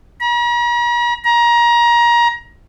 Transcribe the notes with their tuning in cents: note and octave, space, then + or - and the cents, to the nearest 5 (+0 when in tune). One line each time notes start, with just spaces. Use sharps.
A#5 +45
A#5 +25